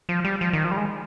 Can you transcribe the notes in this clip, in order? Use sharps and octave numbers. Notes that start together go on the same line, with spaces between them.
F3
G3
F3
D#3
F3
G3
G#3